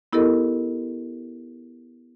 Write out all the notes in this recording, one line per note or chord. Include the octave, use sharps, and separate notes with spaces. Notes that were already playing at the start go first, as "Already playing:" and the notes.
B3 E4 G4 A4 A#4 D#5